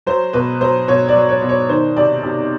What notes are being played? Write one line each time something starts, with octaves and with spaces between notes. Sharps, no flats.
F#3 C5
B2 B4
F#3 C5
B2 C#5
D5
F#3
C#5
B2
C#5
D#3 C5
C3 D5
C3